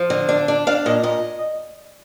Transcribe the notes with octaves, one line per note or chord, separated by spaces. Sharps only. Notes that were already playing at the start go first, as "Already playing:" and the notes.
Already playing: F3
D3
D4
D4
D4 F5
A#2 D#5
A#2 D#5